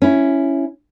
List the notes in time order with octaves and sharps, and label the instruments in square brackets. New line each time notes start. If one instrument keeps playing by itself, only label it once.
[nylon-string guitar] C#4 E4